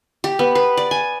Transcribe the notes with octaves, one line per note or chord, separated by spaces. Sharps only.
G4
B3
B4
D5
G#5